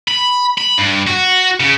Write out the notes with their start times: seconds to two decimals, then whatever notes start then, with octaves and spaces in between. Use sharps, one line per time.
0.08 B5
0.58 B5
0.78 G2
1.07 F#4
1.60 C#3